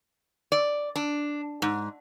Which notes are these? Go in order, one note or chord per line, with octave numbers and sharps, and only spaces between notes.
D5
D4
G#2